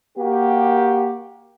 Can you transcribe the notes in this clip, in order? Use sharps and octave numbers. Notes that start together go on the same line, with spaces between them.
A#3 F#4 G4